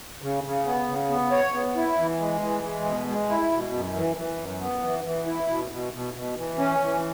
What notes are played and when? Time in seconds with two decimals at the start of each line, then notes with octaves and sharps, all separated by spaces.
0.22 C#3
0.44 C#3
0.66 B3
0.88 C#3
1.10 B3
1.32 C#5
1.54 B3
1.76 E4
1.98 E3
2.20 G#3
2.41 E3
2.63 G#3
2.85 B2
3.07 G#3
3.30 E4
3.51 B2
3.74 F#2
3.95 E3
4.16 E3
4.39 F#2
4.61 B3
4.83 E3
5.04 E3
5.26 E4
5.48 B2
5.70 B2
5.93 B2
6.14 B2
6.36 E3
6.58 C#4
6.80 E3